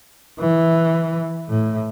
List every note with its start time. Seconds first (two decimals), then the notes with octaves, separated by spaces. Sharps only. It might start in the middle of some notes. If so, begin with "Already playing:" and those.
0.39 E3
1.49 A2